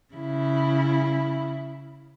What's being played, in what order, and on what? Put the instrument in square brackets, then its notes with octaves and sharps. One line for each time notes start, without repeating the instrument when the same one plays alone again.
[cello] C#3 E4